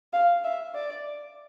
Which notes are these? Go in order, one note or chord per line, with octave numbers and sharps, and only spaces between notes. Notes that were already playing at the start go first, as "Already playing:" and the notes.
F5
E5
D5